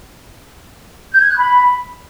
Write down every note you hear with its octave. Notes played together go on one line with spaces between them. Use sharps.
G6
G#6
F#6
B5